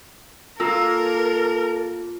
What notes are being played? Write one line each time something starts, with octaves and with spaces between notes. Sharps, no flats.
A#3 F4 A4 A#4 E6